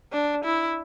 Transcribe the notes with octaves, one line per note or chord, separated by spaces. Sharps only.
D4
E4